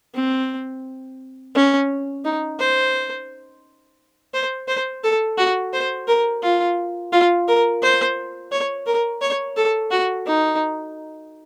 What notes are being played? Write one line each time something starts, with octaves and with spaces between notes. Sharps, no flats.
C4
C#4
D#4
C5
C5
C5
A4
F#4
C5
A#4
F4
F4
A#4
C5
C#5
A#4
C#5
A4
F#4
D#4